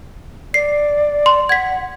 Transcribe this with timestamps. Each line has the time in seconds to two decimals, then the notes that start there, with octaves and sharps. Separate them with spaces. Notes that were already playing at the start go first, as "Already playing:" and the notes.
0.54 D5 C7
1.26 C6
1.49 F#5 G#6 B6